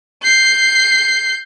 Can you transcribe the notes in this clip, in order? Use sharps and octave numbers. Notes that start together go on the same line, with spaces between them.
G6 C7